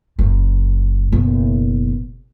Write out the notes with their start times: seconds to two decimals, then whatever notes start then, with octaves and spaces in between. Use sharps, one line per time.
0.19 F#1 F#2
1.12 F#1 B2